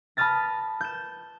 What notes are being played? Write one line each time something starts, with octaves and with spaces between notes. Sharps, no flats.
A5 B5 D#6 F6 A6 A#6
G6 E7